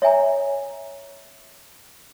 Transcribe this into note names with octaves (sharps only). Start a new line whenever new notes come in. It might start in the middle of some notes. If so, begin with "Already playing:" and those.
C#5 E5 G#5 A#5